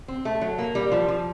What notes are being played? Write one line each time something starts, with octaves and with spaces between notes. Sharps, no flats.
C4
A3
F#3
A#3
G3
F3
F3